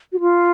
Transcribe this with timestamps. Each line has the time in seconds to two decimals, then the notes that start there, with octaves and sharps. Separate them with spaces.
0.12 F#4
0.20 F4